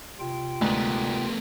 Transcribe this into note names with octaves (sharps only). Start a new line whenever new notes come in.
C3 F4 G5
D2 G#2 A3 B3